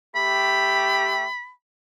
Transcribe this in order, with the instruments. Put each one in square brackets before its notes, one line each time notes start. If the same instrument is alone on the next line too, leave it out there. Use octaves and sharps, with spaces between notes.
[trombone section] A3 G4 [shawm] B5